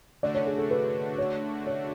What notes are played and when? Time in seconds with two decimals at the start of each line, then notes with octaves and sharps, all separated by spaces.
0.23 D3 A3 D4 F#4 D5
0.35 C#5
0.47 G#4
0.58 A4
0.71 B4
1.18 C#5
1.67 C#5